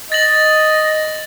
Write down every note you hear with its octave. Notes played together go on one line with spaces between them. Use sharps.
D#5 A6 A#6 F#7